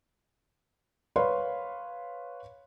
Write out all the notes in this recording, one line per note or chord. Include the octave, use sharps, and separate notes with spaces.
B4 C#5 F5 C6